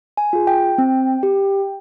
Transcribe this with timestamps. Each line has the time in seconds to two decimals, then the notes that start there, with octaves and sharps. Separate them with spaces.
0.17 G#5
0.33 F4 G#4
0.47 G5
0.78 C4
1.23 G4